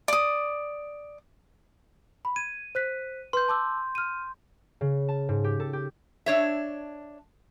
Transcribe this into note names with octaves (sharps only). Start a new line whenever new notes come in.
D5 D#6
B5
G#6 D#7
C5 F#6 B6
B4 C6 G6
A5 D6 E6
F6 D#7
C#3
A5
G#2
G4
A4
G4
D4 C#5 E5